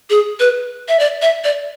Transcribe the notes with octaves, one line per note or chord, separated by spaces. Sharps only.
G#4
B4
E5
D5
E5
D5